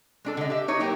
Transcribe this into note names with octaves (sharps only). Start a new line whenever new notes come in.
G#3 D4 A4
D3 D#5
G4 E5
D#4 E4 C#5
F#3 A#3 G4 A#4